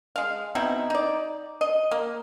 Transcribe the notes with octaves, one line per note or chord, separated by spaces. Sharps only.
G#3 F5
B2 C4 D#4 E4
D#4 D5
D#5
A#3